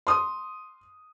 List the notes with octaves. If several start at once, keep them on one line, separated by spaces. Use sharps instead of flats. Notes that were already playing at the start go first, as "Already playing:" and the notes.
C6 D#6